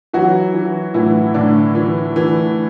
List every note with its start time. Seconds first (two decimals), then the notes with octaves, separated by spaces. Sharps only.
0.13 E3 F#3 F#4
0.54 E3
0.94 A2 E3 E4
1.34 A2 D3 D4
1.75 E3
2.16 E3